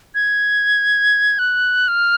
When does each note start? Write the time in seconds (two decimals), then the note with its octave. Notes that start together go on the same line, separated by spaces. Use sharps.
0.15 G#6
1.39 F#6
1.88 F6